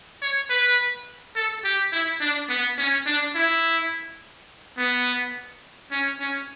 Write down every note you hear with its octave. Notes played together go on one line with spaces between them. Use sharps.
C#5
B4
A4
G4
E4
D4
B3
C#4
D4
E4
B3
C#4
C#4